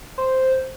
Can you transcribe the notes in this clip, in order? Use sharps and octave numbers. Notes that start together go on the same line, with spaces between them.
C5